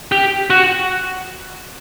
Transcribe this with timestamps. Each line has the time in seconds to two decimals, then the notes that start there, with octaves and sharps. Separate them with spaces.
0.12 G4
0.50 F#4